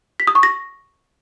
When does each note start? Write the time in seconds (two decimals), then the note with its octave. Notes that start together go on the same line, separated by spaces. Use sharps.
0.20 B6
0.27 D#6
0.35 C#6
0.43 A#6